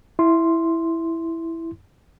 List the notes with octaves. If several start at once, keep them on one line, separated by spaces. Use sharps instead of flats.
E4 C6